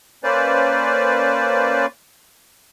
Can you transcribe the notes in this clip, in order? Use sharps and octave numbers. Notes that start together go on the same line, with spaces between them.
A#3 C#4 B4 C5 D5